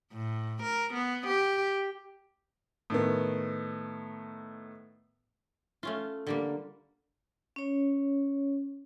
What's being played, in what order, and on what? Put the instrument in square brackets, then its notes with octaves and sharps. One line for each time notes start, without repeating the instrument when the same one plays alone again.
[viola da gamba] A2
A#4
B3
G4
[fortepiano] A2 D#3 B3
[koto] A3 C#4 F4
D3 G3 A#3
[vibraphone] C#4 C#5